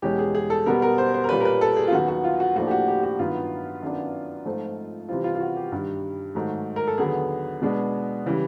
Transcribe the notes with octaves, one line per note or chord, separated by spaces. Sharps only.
E2 B2 G#3 C#4 G4
G#4
G#4
A4
B2 G3 B3 A#4
A#4
C5
C5
A#4
A#2 G3 A#3 C#4 B4
A#4
B4
A4
G#4
F4
D#2 D#3 F#3 B3 F#4
F#4
F4
F#4
A2 F3 A#3 D4 F#4
G4
F#4
G4
F#4
G2 D#3 F#3 B3 F4
F#2 D#3 F#3 B3 D4
G#2 F3 A3 C4 D#4
C3 E3 G3 C4 F4
F4
F4
F#4
G4
G2 D#3 G3
G#2 D#3 F#3 A3
A#4
A4
D#2 D3 F#3 B3 G#4
B2 G#3 B3 D4
C#3 E3 G3